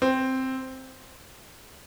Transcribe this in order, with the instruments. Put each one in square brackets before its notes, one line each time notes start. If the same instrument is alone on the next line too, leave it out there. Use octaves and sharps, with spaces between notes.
[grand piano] C4